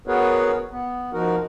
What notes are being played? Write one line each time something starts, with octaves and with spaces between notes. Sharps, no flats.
B3 F#4 G#4 A#4 B4 C#5
B3
F3 D#4 F#4 A#4